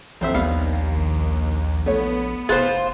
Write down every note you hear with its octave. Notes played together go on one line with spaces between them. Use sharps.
A#1 F2 C5 E5
A#1 D#2 G3 B3 F5
A#1
A3 B3 C#5
F1 F4 G#4 C5 F#6